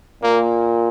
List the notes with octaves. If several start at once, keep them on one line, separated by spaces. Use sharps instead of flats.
A#2 A#3